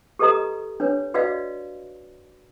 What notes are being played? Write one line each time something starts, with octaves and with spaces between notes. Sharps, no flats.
G4 A4 B4 D#5 A#5 D#6
D4 B4 C#5
F#4 B4 D5 D#5 F5